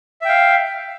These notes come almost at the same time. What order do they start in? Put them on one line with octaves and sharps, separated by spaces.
E5 G5 F5